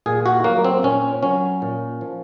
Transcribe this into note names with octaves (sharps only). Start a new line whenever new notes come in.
A#2 G#4
F#4
F#3 A#3
C4
A#2 C#4
F#3 C#4
A#2
F3